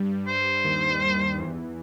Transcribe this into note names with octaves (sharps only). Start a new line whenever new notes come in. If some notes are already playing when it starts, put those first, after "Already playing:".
Already playing: G2 G3
C5
D#2 D#3
E2 E3